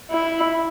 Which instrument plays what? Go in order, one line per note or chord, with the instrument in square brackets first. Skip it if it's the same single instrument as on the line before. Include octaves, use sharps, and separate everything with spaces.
[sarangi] E4